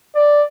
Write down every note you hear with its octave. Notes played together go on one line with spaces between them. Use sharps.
D5